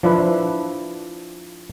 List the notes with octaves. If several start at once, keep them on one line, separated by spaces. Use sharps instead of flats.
F3 D4 E4 B4